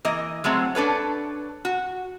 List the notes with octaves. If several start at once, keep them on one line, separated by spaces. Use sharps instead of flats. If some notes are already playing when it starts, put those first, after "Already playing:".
E3 A#3 D#5
F#3 G#3 A3 C4
D4 A4 B4 C#5
F#4